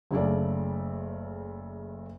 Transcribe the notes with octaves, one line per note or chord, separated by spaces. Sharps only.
F#1 C#3 A3 D5